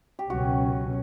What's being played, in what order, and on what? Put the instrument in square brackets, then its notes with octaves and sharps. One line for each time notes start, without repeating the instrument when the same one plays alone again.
[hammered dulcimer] G4
[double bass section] C#2 B2 F#3 C#4 [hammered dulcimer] F#4